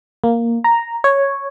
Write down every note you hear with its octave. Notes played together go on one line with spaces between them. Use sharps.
A#3
A#5
C#5